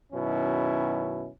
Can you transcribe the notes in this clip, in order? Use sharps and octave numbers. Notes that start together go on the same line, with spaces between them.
F#2 B2 D#3 C#4 E4